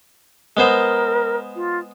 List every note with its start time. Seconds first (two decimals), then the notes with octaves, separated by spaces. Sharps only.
0.57 G#3 B3 A#4 C5
1.56 F4